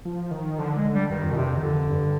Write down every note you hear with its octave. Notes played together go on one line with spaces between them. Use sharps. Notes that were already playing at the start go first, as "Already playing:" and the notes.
F3
D#3
D3 F3
G#3
D3
G3
G2 D#3
F2
B2
G2 C3
F2
D#3
F2 D3
G2